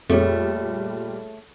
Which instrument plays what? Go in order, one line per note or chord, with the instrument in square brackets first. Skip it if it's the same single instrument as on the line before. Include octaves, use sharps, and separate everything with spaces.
[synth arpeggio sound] F2 [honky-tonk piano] A#2 G3 [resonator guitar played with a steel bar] A3 [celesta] G#4 A4 C#5